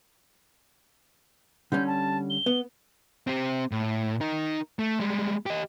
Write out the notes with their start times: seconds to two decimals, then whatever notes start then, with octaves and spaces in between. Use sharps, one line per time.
1.72 D3 G3 C#4 G6
1.87 A5
2.30 G7
2.46 B3
3.27 C4 G4
3.71 A2
4.21 D#4 A#4
4.79 A3
5.00 G3 G#3
5.46 G4 D#5